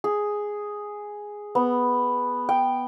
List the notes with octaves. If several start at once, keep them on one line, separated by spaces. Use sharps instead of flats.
G#4
B3
G5